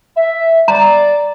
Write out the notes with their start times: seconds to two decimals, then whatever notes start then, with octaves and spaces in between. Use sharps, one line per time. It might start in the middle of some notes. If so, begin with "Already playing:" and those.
0.16 E5
0.68 D5 A#5